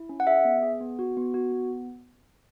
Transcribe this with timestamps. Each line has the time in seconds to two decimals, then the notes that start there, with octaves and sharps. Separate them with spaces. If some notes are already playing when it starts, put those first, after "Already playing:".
Already playing: E4
0.09 C#4
0.20 F#5
0.27 G#4 E5
0.45 B3
0.63 G#4
0.81 B3
0.99 F#4
1.17 B3
1.34 F#4
1.52 B3